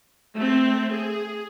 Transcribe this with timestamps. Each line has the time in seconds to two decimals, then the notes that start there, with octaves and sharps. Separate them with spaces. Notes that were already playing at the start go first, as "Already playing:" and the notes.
0.35 A3 C4
0.92 G#4